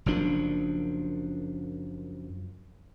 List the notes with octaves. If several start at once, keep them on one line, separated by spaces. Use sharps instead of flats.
F#1 F#2 F3 D4